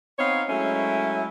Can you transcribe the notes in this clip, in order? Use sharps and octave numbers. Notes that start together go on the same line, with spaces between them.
B3 C4 D#4 C#5 F5
F#3 G#3 A3 C#4 E4